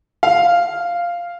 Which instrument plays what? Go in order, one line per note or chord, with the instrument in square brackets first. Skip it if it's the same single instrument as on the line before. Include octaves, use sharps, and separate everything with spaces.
[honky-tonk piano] F5